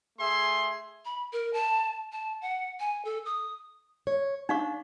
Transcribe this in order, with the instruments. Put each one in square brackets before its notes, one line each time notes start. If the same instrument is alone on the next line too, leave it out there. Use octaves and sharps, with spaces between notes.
[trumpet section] A3 G#4 E5 C6
[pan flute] B5
A#4
A5
A5
F#5
G#5
A4
D#6
[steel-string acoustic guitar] C#5
[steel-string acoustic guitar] D4 [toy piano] D#4 F5 C#6